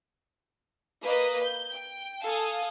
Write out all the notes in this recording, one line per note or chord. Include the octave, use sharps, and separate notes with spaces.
A#3 B4 D#5
G6
G5
A4 F5 G#5 D#6